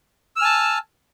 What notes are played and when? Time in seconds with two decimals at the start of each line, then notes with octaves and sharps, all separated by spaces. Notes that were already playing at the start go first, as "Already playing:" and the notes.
0.36 E6
0.39 F6
0.42 G#5
0.45 A5